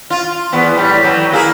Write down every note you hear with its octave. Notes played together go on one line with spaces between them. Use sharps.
F4
E2 B3
A2 G3
E3 F#3 G4
A#3 E4 G#4